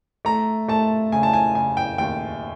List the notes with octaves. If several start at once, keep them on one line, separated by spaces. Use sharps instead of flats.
A3 A#5
A3 A5
C#3 G#5
A5
G#5
C#3 G#5
G5
D#2 G5